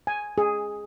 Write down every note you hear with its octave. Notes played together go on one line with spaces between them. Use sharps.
G#5
G#4